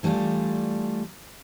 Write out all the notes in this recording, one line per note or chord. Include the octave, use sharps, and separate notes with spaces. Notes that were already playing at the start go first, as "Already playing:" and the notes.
E3 G3 A3 D4 F4